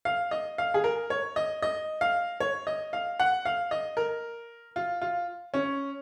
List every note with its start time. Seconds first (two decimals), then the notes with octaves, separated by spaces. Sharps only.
0.05 F5
0.31 D#5
0.58 F5
0.74 G#4
0.84 A#4
1.10 C#5
1.36 D#5
1.62 D#5
2.01 F5
2.40 C#5
2.67 D#5
2.93 F5
3.20 F#5
3.45 F5
3.71 D#5
3.97 A#4
4.76 F4
5.02 F4
5.54 C#4